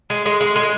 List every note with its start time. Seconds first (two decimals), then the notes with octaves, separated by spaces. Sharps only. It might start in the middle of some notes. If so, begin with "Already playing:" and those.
0.10 G#3
0.26 G#3
0.41 G#3
0.56 G#3